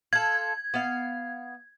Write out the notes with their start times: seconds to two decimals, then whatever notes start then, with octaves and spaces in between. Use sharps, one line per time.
0.13 F4 A4 G#6
0.74 B3 F5